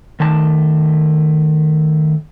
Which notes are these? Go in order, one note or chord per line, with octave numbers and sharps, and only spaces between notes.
D#3 A3 A5